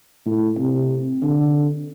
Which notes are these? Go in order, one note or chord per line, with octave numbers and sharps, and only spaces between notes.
A2
C3
D3